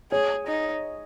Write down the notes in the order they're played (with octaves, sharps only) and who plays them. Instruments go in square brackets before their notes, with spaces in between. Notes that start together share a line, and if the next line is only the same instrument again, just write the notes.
[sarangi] G#4 [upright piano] C#5
[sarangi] D#4